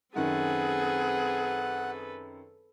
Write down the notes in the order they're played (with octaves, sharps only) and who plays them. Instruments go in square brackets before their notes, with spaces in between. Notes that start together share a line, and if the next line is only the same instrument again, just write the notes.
[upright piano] F#2 D#3 [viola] C4 G#4 [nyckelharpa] A4 B4 [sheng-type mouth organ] F#5